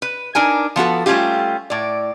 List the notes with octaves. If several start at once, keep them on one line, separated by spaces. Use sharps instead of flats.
B4
D4 D#4 A#4 G#5
F3 B3 F#4 A4
G3 A3 C#4 F4 G4
A2 D5